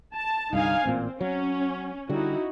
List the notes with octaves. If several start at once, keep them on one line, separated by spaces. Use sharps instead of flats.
A5
C2 G2 D3 D#4 F5 G#5
A1 A#2 C4
F#3 C#4
D3 G3 D#4 E4 F#4